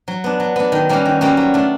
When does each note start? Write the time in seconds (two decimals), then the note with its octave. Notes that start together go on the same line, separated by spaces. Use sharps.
0.08 F#3
0.24 B3 D4
0.40 F#3
0.56 B3 D4
0.72 D#3
0.89 G3 A#3 C#4 F#4
1.05 D#3
1.21 G3 A#3 C#4 F#4
1.37 F#3
1.54 A3 D4 F4